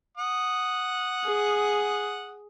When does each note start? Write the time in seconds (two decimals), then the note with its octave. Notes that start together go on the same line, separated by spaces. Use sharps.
0.17 F#5 D#6
1.24 G#4